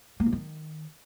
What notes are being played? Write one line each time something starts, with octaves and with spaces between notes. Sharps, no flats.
A#3
G#2
D#3